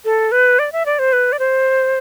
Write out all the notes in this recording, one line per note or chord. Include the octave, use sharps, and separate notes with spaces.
A4
B4
D5
E5
D5
C5
B4
D5
C5